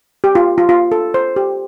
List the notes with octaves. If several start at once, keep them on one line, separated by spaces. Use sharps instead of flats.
G4
F4
F4
F4
A4
C5
G4